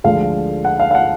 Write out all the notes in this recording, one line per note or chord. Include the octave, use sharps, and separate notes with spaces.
D2 D3 F3 G#3 F5
F#5
F5
F5
F#5